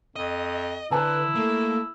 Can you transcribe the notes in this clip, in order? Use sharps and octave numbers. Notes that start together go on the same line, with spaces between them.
F2 D#5
D3 E4 B4 C5 A5 A#5
A3 A#3